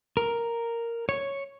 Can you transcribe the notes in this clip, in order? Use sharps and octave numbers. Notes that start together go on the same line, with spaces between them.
A#4
C#5